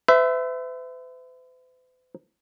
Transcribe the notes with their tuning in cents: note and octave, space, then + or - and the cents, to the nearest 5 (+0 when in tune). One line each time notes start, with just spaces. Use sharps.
B4 +45 E5 +0